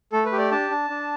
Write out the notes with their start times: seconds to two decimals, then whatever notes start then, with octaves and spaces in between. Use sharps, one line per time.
0.12 A3 A4
0.26 B4
0.32 G4
0.38 D5
0.51 D4 A5
0.70 D4
0.90 D4